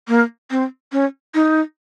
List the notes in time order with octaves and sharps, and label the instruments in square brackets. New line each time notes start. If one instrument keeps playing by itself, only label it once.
[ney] A#3
C4
C#4
D#4